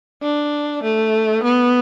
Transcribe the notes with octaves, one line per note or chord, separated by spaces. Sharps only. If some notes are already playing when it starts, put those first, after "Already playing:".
D4
A3
B3